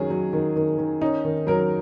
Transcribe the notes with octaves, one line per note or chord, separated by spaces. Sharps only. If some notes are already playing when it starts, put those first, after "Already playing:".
Already playing: D#3 F#3 C#4 G#4
F#3
D#3
D#3
D#3
C#4 D#4
D#3
F#3 A#4